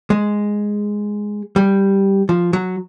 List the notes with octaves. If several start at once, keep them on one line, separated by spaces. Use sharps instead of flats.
G#3
G3
F3
F#3